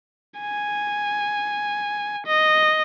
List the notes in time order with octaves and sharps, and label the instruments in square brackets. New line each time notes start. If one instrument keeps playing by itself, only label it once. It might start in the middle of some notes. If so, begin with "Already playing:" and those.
[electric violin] G#5
D#5